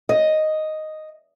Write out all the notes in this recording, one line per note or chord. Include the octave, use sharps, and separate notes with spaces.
D#5